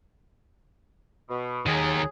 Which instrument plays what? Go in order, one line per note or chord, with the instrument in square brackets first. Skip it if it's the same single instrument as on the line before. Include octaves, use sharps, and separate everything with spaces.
[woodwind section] B2
[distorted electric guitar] D#2 D#3 [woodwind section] F#3 G#4